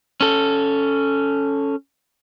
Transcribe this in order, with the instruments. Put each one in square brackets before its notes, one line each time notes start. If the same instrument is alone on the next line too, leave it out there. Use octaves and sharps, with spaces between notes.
[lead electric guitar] C#4 A4